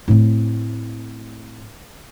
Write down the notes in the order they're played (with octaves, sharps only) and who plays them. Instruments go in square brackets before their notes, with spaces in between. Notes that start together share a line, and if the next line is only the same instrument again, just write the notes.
[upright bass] A2 C4